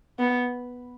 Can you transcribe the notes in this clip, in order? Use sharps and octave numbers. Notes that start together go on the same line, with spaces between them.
B3